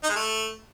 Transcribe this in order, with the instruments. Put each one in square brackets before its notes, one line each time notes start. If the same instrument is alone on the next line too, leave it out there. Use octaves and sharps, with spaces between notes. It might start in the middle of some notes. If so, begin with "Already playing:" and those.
[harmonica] D#4
G#3
A3